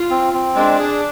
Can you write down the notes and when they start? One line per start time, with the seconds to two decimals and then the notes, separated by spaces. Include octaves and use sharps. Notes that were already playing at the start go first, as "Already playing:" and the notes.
Already playing: F4
0.11 C4
0.34 C4
0.56 G#3 D4
0.79 G#4